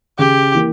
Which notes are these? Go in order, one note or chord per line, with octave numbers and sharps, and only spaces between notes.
C#3 G4
E3 A#3